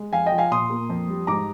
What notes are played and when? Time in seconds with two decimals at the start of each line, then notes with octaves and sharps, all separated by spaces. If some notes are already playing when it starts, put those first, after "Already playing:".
Already playing: G#3
0.13 F2 F5 G#5
0.26 D#5 G5
0.32 F3
0.38 F5 G#5
0.51 A#2 C6 D#6
0.70 A#3
0.89 F2
1.08 G3
1.27 G#2 A#5 D6